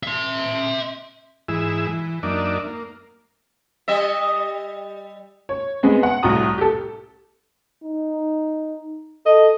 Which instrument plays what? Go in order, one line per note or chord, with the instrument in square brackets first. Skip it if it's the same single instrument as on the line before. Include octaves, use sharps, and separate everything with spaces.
[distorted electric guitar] E5 C6
[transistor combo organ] G#2 E3 E4 G#4 E6
E3
F#2 A#3 D4 D#4 D5 E5
A#3
[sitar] G3 D#5 E5
[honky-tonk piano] C#5
G#3 B3 C4
F#5
C2 A2 F#4 A#5 D#6
G4 A4
[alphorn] D#4
[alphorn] A4 [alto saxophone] D#5